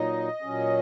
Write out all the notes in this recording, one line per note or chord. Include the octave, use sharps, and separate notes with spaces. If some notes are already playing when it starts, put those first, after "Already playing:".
Already playing: A#2 F#3 D#4 D#5
A#2 F#3 C#4